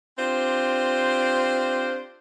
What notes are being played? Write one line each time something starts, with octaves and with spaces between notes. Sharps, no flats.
C4 D4 F4 G4 C5